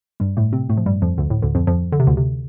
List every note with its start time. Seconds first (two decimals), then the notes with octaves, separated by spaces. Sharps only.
0.20 G2 G3
0.37 A2 A3
0.53 C3 C4
0.69 A2 A3
0.77 F3
0.86 G2 G3
1.02 F2 F3
1.18 D2 D3
1.30 A2
1.42 D2 D3
1.55 F2 F3
1.67 F2 F3
1.92 D3
2.00 C3
2.07 D2 D3
2.17 C3